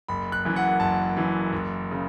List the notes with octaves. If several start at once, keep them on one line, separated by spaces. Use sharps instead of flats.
F#1 B5
F#6
F#2 E3
F#5
F#1 A5
F#2 E3
F#1
C#3